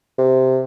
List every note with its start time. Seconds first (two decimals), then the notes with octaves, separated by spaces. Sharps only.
0.19 C3